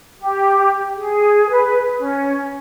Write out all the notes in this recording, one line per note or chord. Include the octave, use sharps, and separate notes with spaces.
G4
G#4
B4
C#4